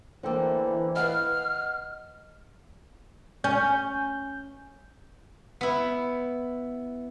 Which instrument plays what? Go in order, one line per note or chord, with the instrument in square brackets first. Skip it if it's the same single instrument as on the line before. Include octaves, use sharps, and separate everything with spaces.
[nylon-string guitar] D3 A#3 [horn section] E3 [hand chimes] C5 G5 E6
[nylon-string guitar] B4 F5 [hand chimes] D#5 F#5 [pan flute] F6
[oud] C#4 [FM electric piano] G6
[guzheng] B3 E4